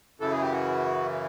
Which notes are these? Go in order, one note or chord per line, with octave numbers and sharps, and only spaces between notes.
F#2 C#3 E3 A4
G#4
G4
F#4